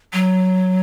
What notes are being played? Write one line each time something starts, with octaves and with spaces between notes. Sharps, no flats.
F#3